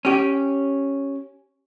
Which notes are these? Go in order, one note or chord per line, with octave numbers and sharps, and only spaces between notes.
C#4 G4